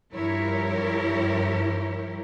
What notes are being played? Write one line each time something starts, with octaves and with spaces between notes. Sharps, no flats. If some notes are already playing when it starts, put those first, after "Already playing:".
G2 F3 E4 G4 A#4 C#5